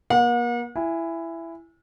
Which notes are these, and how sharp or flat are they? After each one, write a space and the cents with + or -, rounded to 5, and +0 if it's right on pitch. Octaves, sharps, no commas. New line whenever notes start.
A#3 +40 F#5 -45
E4 +15 G#5 -15